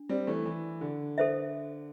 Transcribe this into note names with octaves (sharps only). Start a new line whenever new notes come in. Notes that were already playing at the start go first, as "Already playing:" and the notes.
Already playing: D4
G3 C4
E3 A3
E3
D3
A4 C5 E5